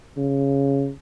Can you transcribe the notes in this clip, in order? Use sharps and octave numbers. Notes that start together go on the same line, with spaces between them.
C#3